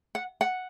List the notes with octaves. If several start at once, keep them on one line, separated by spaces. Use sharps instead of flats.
F#5
F#5